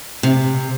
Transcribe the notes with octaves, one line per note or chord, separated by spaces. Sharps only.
C3